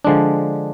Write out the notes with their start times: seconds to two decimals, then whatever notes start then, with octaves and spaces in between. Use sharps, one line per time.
0.05 D3 F3 G#3 D4